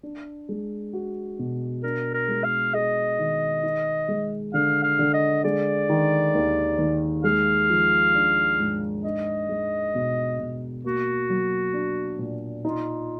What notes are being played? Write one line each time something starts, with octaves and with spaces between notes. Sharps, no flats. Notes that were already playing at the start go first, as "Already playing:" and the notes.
D4
G#3
F#4
B2
D4 A#4
A#4
G#3
F5
G#4 D#5
D#3
D#4
G#3
D3 F5
F5
D3
D#5
G#3 D5
D#3
D#2
D#2
G#3 F5
F3
D4
G#2
D4 D#5
G#3
B2
B2
A#3 F#4
F#3
D4
A#2
D#4 F4